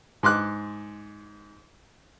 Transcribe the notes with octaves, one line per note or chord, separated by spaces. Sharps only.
G#2 C6 D6 F#6